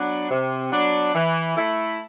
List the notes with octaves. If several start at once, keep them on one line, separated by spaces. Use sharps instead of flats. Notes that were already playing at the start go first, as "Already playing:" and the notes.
Already playing: F#3 B3 D4
C3
F#3 B3 D4
E3
A3 E4